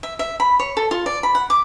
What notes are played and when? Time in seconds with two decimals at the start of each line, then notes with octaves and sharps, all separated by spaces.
0.03 E5
0.19 E5
0.40 B5
0.60 C#5
0.77 A4
0.91 F4
1.06 D5
1.23 B5
1.35 F#5
1.50 D6